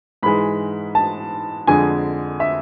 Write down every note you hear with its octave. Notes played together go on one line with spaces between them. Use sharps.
G#2 E3 G#3 B5
A5
F2 D3 G#3 G#5
E5